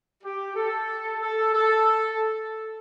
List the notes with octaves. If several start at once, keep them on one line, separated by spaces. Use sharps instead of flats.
G4
A4
A4
A4